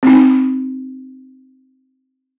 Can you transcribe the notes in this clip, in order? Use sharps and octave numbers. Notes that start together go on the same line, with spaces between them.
C4 D#4